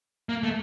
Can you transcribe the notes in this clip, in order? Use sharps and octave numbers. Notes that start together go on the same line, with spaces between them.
A#3
A3